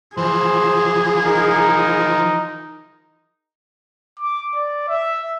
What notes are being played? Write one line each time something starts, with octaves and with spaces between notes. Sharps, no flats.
E3 F3 G#4 C5
D#4 A#4
D6
D5
E5